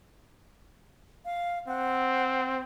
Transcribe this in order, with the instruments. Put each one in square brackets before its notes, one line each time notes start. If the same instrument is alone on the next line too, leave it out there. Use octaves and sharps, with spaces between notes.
[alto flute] F5
[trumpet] C4 [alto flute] F#5